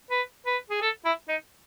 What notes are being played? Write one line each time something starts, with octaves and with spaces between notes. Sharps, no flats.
B4
B4
G#4
A4
E4
D#4